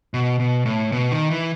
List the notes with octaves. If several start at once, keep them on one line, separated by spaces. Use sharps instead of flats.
B2
B2
A2
B2
D#3
E3